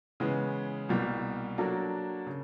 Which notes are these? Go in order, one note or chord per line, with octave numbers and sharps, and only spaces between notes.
C#3 E3 G#3 B3
C2 B2 G3 A#3
F#3 A#3 D4 F#4 A4
C#3